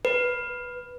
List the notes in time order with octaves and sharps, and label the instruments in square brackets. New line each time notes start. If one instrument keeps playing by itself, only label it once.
[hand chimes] B4